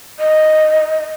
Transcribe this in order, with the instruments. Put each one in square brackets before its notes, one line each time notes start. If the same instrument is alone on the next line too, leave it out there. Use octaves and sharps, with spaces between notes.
[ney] D#5